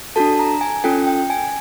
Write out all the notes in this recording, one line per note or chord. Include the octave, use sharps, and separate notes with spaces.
D4 F#4 A4 A5
A#5
G#5
C#4 F4 A4 G5
G5
G#5